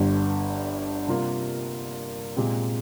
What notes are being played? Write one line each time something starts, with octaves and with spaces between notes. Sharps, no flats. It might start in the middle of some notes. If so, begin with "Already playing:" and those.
Already playing: G1 G2 D3 G3
C3 G3 A#3 F4 A#4
A#2 G#3 C4 G4